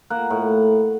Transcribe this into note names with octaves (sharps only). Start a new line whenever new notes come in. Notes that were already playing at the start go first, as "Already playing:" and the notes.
A#3 F#5
A2